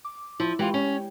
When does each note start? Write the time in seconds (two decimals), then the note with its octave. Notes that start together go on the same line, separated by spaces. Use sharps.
0.05 D6
0.40 F3 E4
0.59 E3 G#3 F4 G4 G5
0.74 C#4